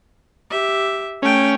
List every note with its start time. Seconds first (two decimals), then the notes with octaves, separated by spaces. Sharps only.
0.50 G4 E5
1.22 A3 C#4 G5